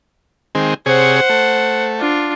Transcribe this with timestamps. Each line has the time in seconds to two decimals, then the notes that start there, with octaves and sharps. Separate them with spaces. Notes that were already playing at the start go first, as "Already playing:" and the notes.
0.55 D#3 G#3 C4
0.86 C3 G#4 C5 C#5 F#5
1.30 A3
1.99 D4 F4